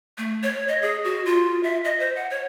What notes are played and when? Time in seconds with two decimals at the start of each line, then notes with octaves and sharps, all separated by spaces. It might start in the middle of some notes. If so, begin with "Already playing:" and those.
0.18 A3
0.43 C#5
0.68 D#5
0.82 G#4
1.04 F#4
1.25 F4
1.63 E5
1.85 D#5
2.00 C5
2.16 F#5
2.30 C#5